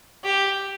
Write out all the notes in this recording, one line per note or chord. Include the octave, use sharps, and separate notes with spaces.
G4